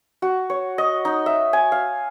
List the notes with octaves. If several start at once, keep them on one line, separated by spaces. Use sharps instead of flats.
F#4
C#5
D#5
D#4
E5
G#5
F5